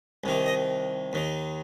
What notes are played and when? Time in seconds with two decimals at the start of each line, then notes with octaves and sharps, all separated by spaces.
0.24 C2 C3 D#3
0.46 D#5
1.13 D#2 D#3